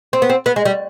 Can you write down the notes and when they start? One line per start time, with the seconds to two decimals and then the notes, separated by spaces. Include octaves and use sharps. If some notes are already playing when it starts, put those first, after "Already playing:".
0.13 C4
0.22 B3
0.30 C4
0.46 B3
0.56 G#3
0.65 G3